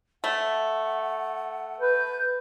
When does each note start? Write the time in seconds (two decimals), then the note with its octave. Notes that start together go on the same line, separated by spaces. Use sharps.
0.24 A3 F#5
1.81 B4 G6